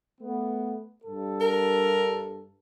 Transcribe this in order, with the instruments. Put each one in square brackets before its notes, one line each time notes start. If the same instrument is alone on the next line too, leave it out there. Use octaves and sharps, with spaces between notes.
[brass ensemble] A3 B3
G2 A4
[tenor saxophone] A#4